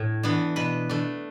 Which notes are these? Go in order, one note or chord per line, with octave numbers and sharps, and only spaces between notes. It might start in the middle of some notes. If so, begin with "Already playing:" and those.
Already playing: A2
E3 B3 D4
B2 B4
A3 D4